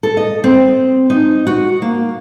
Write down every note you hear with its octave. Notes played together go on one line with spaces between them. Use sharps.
A4
D#5
C4
D#4
F#4
A#3